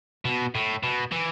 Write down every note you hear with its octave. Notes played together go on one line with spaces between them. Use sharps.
B2
A2
B2
E3